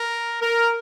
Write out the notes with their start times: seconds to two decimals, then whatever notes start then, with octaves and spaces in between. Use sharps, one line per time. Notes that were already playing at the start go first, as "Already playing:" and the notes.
Already playing: A#4
0.42 A#4